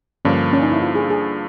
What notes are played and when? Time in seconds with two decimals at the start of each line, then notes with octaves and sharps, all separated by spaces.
0.25 G2 D3 F3 A#3 C#4
0.53 C#4
0.62 D#4
0.72 E4
0.82 F4
0.96 G#4
1.10 G#4